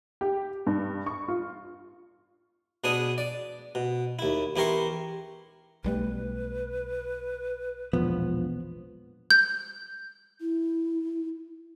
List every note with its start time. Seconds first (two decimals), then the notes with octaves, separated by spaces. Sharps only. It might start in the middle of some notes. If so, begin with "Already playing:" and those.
0.21 G4
0.67 G2
1.06 C#6
1.28 F4
2.84 B2 B3 D4 G#4 D#6
3.18 D5
3.75 B2
4.19 D#2 E4
4.56 E2 E4 G4 A#4 C6 C#6
5.84 B1 G3 A3 B4
7.93 E1 A#1 F3 B3
9.31 G6
10.41 E4